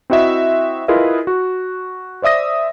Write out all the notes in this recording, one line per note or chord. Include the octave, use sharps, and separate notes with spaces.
C4 E4 F#4 D#5 E5
E4 F4 G#4 A#4 B4 D#5
F#4
C5 D5 E5 D#6 A#6